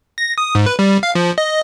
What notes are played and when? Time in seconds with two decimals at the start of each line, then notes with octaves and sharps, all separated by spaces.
0.18 A#6
0.38 D#6
0.55 G#2
0.66 B4
0.79 G3
1.03 F5
1.15 F3
1.38 D#5